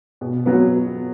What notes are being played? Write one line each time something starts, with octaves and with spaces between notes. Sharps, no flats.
B2
F#3 B3